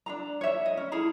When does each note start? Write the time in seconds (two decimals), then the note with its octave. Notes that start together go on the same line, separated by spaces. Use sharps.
0.06 D4 G#4 A#5
0.41 C#5 E5
0.66 D#5
0.77 C#4
0.92 E4 G#4 A#5